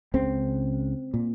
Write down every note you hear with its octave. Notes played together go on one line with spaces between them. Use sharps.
C#2 C#3 C4
A#2